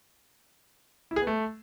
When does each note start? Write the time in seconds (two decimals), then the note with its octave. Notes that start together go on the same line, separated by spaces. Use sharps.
1.11 E4
1.16 G#4
1.22 B3
1.27 A3